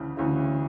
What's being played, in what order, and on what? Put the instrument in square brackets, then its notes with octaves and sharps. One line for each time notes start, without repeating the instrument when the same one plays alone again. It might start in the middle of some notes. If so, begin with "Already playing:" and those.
Already playing: [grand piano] D2 C#3 E3
D2 C#3 E3